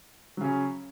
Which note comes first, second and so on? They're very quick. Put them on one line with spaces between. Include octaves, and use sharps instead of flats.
F#3 C#3 C#4